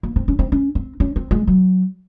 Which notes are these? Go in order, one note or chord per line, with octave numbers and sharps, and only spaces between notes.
A#3
C4
C#4
C4
C#4
C4
C#4
C4
G#3
F#3